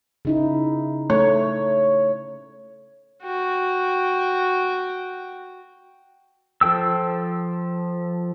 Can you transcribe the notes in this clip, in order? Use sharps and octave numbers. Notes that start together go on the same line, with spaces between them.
C#3 D#4 E4
A3 C#5
F#4 G5
F3 A4 G5 E6